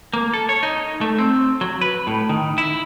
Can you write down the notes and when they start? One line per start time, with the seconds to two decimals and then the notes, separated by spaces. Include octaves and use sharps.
0.13 A#3
0.34 A4
0.49 C#5
0.63 D#4
1.01 A3
1.18 C4
1.61 F#3
1.81 B4
2.07 A2
2.29 D#3
2.58 E4